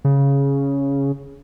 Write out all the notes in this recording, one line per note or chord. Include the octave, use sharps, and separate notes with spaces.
C#3